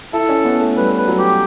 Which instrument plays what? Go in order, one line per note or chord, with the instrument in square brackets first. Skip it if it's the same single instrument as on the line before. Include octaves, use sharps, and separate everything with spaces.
[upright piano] E4 [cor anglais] A4
[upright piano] C#4
B3
A3
[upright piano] G3 [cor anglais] B4
[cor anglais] B4
[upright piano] F#3
[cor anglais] G4